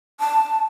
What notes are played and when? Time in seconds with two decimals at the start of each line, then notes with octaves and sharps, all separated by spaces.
0.20 A5